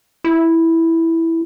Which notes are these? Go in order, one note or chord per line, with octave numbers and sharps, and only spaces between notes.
E4